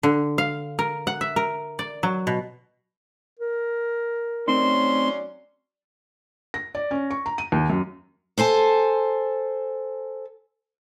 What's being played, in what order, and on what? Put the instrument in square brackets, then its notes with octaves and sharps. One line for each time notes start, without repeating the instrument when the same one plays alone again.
[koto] D3
F5
A#4
F#5
E5
A#4
D5
F#3
B2
[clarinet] A#4
[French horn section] F#3 C#4 D5 [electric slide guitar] A3 C4 D#4 [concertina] C6
[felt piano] A#6
D5
C#4
C#6
A#5
D#7
D#2
F#2
[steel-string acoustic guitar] A4 C5 G#5 A5